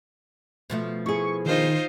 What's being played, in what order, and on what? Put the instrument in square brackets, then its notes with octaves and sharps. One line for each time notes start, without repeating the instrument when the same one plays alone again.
[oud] B2 F3 A3
[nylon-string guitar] E4 G#4 [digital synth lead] C#6
[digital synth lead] D#3 [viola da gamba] D#4 F4 C5